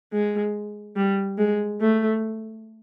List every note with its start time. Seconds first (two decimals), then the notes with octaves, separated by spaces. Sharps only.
0.13 G#3
0.96 G3
1.38 G#3
1.80 A3